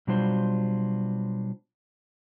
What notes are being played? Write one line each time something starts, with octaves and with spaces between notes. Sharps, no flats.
B2 F#3 G3 D4 F4 C5